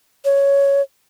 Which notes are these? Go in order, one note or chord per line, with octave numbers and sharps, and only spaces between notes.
C#5